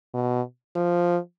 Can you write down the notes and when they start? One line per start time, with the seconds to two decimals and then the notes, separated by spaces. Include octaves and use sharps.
0.14 B2
0.76 F3